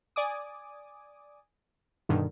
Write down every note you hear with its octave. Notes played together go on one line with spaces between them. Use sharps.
D5 G#5 D6 D#6
G2 B2 D3 D#3